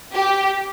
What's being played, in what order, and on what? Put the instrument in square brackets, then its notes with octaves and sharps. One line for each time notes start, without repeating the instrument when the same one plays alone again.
[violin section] G4